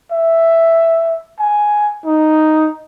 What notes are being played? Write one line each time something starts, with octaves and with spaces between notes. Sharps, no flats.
E5
G#5
D#4